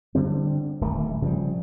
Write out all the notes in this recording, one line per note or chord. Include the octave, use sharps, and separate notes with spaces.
D3 G3 C4
D1 D#3 A3
C#3 F3 G3